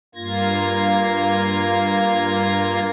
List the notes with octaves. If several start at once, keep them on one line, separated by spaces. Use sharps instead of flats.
G2 A#3 F4 G#6 A#6